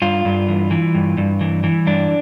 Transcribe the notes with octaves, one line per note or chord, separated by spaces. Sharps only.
G2 F4
G2
E3
E3
G2
G2
E3
E3
G2 D4